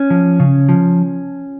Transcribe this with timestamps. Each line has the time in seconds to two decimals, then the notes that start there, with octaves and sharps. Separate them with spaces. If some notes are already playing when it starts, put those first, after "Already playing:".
Already playing: C#4
0.10 F3
0.40 C#3
0.69 F3